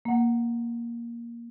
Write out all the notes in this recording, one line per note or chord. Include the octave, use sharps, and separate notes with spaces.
A#3 F#5